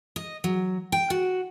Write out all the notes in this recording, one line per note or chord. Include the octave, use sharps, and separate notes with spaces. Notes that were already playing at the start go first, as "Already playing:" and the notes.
D#5
F#3
G5
F#4